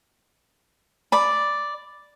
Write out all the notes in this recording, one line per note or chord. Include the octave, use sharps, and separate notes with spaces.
D5 B5